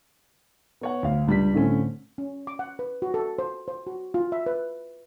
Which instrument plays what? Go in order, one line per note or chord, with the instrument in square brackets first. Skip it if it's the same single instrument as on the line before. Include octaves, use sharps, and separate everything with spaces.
[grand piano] B3 C#5 F#5
D2 F5
C#2 G3 D4 B6
A2 D3 A3 C4 C#4
[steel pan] C#4
D6
F#5
B4
F#4
A4
C5
C5
F#4
F4
E5
B4